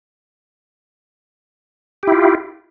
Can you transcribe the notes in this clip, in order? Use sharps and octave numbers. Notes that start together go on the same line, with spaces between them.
E4 F4 G4